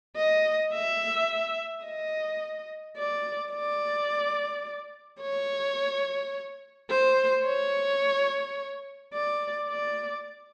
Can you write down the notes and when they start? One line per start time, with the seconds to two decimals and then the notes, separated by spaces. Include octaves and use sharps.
0.17 D#5
0.74 E5
1.85 D#5
2.97 D5
3.53 D5
5.21 C#5
6.90 C5
7.45 C#5
9.14 D5
9.69 D5